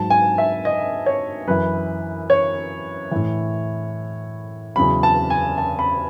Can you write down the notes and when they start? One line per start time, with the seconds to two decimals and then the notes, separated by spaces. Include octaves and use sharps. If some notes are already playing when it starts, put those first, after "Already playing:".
Already playing: G#2 F#3 A5
0.10 G#5
0.38 E5
0.65 D#5
1.06 C#5
1.47 F#2 E3 B4
2.30 C#5
3.11 A2 E3
4.76 E2 C#3 F#3 B5
5.03 A5
5.30 G#5
5.58 A5
5.79 B5